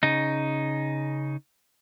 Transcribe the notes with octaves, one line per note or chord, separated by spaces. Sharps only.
C#3 D#4